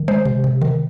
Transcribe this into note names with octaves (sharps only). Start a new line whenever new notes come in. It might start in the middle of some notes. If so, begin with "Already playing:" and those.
Already playing: D#3
G#3 C5
C3
C3
D#3